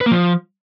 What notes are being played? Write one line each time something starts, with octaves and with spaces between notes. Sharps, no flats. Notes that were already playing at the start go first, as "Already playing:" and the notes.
B4
A#3
F3